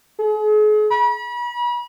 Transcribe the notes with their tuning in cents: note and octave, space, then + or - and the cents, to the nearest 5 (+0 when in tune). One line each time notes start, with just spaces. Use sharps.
G#4 +40
B5 -40